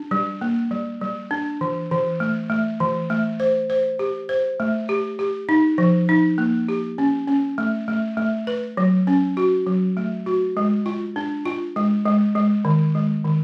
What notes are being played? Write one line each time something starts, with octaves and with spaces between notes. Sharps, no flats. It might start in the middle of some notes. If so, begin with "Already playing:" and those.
Already playing: D4
G3
A#3
G3
G3
D4
E3
E3
A3
A3
E3
A3
C5
C5
G4
C5
A3
G4
G4
D#4
F3
D#4
A#3
G4
C#4
C#4
A3
A3
A3
B4
F#3
C#4
F#4
F#3
A3
F#4
G#3
F4
D4
F4
G#3
G#3
G#3
D#3
G#3
D#3